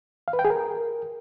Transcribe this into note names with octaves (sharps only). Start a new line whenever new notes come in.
F5
B4
G5
G#4
A#4